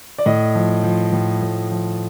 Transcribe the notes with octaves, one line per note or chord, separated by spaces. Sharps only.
D5
A2 D#5
F3
F3
A2
A2
F3